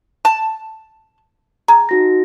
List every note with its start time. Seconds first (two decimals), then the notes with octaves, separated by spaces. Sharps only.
0.25 A5
1.68 G#4 A#5
1.89 D#4 F#4 A#6